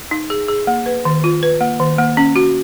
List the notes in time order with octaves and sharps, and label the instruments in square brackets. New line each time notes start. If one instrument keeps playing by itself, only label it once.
[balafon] D#4
G#4
G#4
A#3
B4
D#3
F4
B4
A#3
D#3
A#3
C#4
F#4